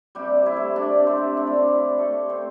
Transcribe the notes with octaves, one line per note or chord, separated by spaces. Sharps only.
C3 G3 G4
C3
E4
A3
A3 D4
C3
C4 C5
C3
A3 D4
E4
A3 D4
E4
C3
C3 A3 A4
A3
C4 C5